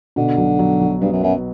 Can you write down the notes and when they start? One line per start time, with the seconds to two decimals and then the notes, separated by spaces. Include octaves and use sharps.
0.16 B2 D3
0.37 B1
0.59 F#3
0.81 B1
1.01 G2 B3
1.13 F#2
1.23 F#2 B3